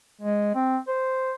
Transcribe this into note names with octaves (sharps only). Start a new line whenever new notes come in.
G#3
C4
C5